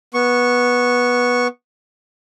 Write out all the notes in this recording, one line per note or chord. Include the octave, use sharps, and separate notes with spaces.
B3 C#6